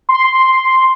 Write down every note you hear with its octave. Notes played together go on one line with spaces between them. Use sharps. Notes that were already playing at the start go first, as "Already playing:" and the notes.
C6